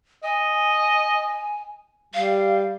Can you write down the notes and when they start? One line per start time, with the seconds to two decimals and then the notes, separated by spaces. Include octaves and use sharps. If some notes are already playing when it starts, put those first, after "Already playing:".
0.24 D#5 G#5
2.14 G3 F5